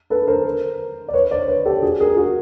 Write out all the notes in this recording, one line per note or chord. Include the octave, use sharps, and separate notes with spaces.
A4 B4
A#4 C5
D5
B4 C#5
C5 D5
B4 C#5
G4 A4
F#4 G#4
G#4 A#4
F#4 G#4